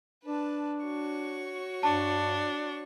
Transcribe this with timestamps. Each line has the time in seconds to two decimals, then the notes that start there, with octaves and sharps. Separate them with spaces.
0.25 D4 B4 A5
0.84 F#4 C#5 C#6
1.83 G2 D4 A5